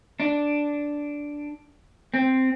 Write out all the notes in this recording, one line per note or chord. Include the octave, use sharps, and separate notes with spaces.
D4
C4